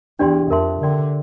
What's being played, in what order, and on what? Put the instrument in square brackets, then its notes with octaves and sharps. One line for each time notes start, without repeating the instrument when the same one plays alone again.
[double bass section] E2 [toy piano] D4 G4 D5 G5 C6
[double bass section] F2 [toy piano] A#4 E5 A5 C6
[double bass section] D3 [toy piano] A#4 D5 G5 C6